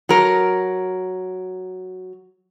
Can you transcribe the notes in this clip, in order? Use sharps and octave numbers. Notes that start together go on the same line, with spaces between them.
F#3 A#4